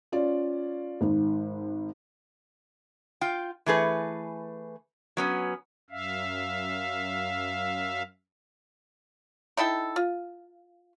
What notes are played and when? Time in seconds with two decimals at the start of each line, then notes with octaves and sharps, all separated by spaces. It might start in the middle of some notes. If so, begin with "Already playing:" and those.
0.12 C#4 F4 D5
1.01 G#1 G#2
3.21 F4 G5
3.66 E3 A3 G#4 B4
5.17 F#3 B3 C#4
5.90 F#2 E5 F5
9.57 D#4 E4 A4 G5
9.96 F4